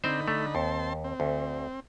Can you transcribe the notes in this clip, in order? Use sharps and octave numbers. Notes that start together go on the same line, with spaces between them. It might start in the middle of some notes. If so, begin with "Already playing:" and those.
D3 C4 D#4 C5 B5
A3
D#2 C4 A5 C6
C4
D2